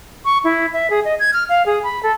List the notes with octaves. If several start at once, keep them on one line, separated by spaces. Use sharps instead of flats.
C#6
E4
E5
G#4
D#5
G#6
F6
F5
G#4
B5
A4